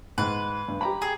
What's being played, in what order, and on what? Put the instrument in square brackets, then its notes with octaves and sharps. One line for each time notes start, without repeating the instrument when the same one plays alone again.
[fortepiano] G#2 [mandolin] B4
[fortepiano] G2
G4 A#5 B5
[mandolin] G#4